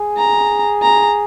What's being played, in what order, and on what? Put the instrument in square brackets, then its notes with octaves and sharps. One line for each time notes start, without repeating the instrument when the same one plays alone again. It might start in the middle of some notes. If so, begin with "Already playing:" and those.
Already playing: [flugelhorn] G#4
[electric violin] A#5
A#5